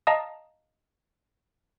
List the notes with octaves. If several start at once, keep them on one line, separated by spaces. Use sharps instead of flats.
D#5 F5 A5 A#5 D#6